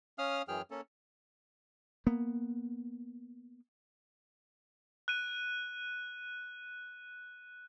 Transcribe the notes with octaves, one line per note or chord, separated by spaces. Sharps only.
C#4 F5 D#6 F6
F#2 E3 F#3 G#4 G5 F6
A#3 C#4 A4
A#3 B3
F#6 D#7